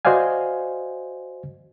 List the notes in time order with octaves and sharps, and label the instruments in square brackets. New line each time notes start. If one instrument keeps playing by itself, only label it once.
[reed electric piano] F#4 C5 D5 D#5 F5 G#5